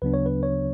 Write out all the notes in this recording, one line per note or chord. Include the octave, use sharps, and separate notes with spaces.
D2 C#3 F#3 B3 D4 B4
C#5
B4
C#5